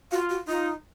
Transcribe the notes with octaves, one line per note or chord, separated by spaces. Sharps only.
F4 F#4
F#4
D#4 F4